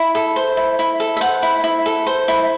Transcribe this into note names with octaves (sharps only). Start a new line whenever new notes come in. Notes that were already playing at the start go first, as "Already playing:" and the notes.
Already playing: E4
A4
C5
E4
E4
A4
E5
C5 F#5
E4
E4
A4
C5
E4